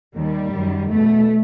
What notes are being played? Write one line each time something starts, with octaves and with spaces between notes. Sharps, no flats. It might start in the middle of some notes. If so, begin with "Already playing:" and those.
D#2 D#3 G3
F#2 D#3
E2 B2 A3